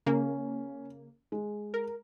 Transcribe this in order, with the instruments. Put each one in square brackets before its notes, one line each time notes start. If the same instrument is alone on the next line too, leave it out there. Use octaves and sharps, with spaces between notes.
[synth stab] C#3 A#3 [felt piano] C#4
[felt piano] G#3
[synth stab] A#4